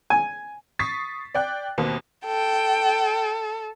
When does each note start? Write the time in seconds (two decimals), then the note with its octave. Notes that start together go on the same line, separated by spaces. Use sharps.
0.10 G#5
0.79 C#6 D#6 A6 B6 C7
1.35 D5 G5 F#6
1.78 D#2 B2 A#3 C4
2.25 A4 G5